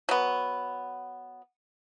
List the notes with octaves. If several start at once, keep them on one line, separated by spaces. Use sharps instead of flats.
F#3 B3